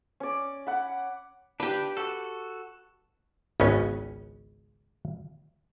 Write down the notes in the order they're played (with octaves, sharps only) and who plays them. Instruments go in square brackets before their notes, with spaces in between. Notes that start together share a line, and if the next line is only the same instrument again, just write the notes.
[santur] C#4 D5
F#5 B5
[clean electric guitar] D4 [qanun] G4 B4
[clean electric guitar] F#4 A4
[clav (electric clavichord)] G#1 C#2 C#3 B3 C#4